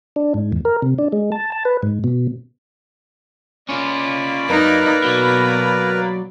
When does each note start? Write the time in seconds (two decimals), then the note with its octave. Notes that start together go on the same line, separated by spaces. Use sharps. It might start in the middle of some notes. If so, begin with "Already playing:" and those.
0.16 D4
0.34 G#2
0.52 E2
0.65 A#4
0.82 C3
0.99 D4
1.12 G#3
1.32 A5
1.52 A5
1.65 B4
1.83 G#2
2.04 B2
3.69 A#3 C#4 F4 D5 B5
4.49 F#2 D#4 A#4 B4 A#5
5.04 B2 F#3